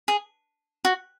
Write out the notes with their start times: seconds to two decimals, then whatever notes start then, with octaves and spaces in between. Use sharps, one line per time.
0.08 G#4
0.85 F#4